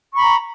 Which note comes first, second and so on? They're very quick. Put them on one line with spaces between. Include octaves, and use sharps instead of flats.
C#6 B5 A#5